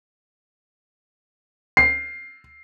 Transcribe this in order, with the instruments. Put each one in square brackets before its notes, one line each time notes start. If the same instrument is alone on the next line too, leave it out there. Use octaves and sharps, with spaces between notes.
[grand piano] C7